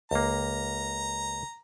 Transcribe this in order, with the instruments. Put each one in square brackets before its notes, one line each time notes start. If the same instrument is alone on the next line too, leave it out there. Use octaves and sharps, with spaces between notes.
[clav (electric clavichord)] C#2 A#3 [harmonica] A#5